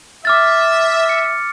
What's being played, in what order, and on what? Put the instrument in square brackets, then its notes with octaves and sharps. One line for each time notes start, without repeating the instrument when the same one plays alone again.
[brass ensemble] E5 [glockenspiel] D6 F6 A6
[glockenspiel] C#7